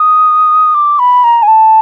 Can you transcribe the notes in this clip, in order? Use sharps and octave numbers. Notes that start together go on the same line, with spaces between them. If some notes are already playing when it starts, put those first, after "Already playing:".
Already playing: D#6
D6
B5
A#5
G#5
A5